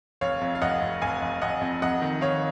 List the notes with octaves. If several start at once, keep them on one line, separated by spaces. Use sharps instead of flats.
F1 C#5 F5
F2
F5
F1 D#5 F#5
F1
F1 F5 G#5
F1
F1 D#5 F#5
F2
F2 D#5 F#5
D#3
D#3 C#5 F5